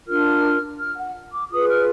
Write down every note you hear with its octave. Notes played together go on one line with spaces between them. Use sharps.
D4 F4 A#4 F6
F6
F#5
D6
F4 G#4 B4 D#6
F6